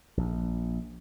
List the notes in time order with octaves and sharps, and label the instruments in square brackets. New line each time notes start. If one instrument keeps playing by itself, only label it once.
[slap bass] A#1